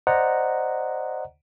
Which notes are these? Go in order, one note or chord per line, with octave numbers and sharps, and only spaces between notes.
C5 D5 D#5 F#5 A#5